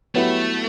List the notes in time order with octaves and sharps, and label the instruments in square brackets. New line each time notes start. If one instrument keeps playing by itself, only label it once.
[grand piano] F#3 B3 E4 G4 [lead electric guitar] A3